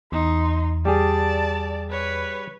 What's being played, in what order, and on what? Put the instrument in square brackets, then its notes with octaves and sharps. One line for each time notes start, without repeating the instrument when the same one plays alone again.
[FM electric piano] E2 [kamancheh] D#4 C6
[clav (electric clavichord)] G3 G4 G#4 [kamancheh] D5 A5
[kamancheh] B4 C#5